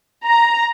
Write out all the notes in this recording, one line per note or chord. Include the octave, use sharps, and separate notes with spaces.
A#5